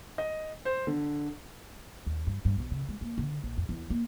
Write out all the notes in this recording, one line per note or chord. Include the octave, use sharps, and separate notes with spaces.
D#5
C5
D3
D#2
G2
G2
B1
C#3
G#3
A#3
D3
A#1
F2
E2
A#3